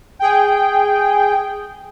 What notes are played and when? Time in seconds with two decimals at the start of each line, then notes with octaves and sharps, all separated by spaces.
0.19 G#4 G5